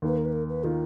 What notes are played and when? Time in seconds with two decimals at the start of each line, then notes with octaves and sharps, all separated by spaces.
0.02 D#2 D#3 A#3 B4
0.17 A#4
0.25 B4
0.32 A#4
0.49 B4
0.64 D#3 A#3 F4